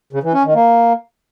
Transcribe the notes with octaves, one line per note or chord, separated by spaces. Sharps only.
C#3
E3
C#4
D#3
A#3